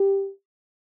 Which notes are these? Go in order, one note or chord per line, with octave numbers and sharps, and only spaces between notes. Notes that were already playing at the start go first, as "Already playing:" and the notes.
Already playing: G4